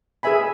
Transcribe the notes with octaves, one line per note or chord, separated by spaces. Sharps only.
G#4 B4 E5 G#5 B5